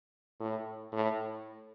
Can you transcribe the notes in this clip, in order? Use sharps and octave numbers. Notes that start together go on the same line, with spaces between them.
A2
A2